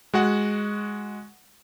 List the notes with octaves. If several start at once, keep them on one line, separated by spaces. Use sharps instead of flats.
G#3 F#4 F#5